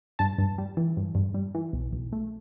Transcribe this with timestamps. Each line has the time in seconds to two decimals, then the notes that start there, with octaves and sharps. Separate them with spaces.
0.19 G2 A5
0.38 G2
0.58 G3
0.77 E3
0.97 G2
1.15 G2
1.34 G3
1.55 E3
1.73 B1
1.93 B1
2.12 A3